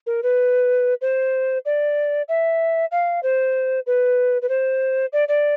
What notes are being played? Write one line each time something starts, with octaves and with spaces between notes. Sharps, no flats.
A#4
B4
C5
D5
E5
F5
C5
B4
B4
C5
D5
D5